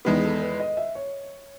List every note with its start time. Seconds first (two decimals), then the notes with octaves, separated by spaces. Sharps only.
0.05 E2 D#3 G#3 B3 G#4
0.24 A4
0.41 B4
0.60 D#5
0.77 E5
0.95 C#5